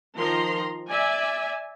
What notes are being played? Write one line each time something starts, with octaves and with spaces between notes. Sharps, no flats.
D#3 F3 A#5 C6
D5 E5 G#5